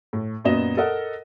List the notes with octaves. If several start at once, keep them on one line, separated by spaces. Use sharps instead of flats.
A2
F#2 A#2 B3 D#5 E7
A4 A#4 D#5 F#5